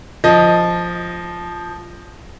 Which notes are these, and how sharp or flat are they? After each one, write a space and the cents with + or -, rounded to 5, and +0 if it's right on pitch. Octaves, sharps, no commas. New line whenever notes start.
F3 +0 D#5 +0